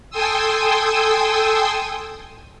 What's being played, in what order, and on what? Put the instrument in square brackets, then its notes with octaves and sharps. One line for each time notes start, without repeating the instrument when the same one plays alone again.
[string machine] A4 G5 G#5 C6 D#6 E6